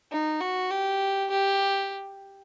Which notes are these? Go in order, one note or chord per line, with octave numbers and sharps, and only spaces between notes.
D#4
F#4
G4
G4